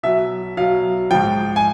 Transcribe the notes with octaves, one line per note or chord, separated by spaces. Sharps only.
B2 F#3 E5
B2 F#3 F5
G#2 F3 G5
G#5